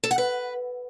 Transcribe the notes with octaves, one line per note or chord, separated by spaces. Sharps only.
A4
F#5
B4